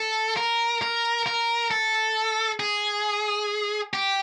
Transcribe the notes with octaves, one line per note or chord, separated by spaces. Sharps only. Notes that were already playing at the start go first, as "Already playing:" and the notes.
Already playing: A4
A#4
A#4
A#4
A4
G#4
G4